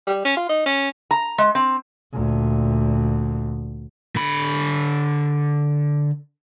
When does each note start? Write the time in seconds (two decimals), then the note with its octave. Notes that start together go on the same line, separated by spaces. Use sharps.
0.07 G3
0.25 C#4
0.37 F4
0.49 D#4
0.66 C#4
1.11 A#5
1.38 G#3
1.55 C4
2.13 D2 A#2
4.16 D3 B5